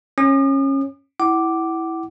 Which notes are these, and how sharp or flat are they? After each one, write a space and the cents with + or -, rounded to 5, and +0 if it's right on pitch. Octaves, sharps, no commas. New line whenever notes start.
C#4 -20 D#6 -45
E4 -5 F#5 +30 D6 +0